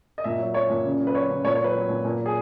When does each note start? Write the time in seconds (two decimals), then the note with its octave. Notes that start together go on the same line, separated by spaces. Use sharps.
0.18 D#5
0.24 A#2 E5
0.39 F#3
0.54 F#3 C#5
0.70 A#2
0.84 C#3
1.00 F#3
1.07 B4
1.15 F#3 C#5
1.29 C#3
1.44 A#2 C#5
1.55 C#5
1.60 F#3 B4
1.74 F#3
1.89 A#2
2.05 A#2
2.19 F#3
2.26 G#4